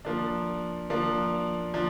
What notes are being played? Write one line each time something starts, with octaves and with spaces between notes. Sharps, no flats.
F3 A#3 D4
F3 A#3 D4
F3 D4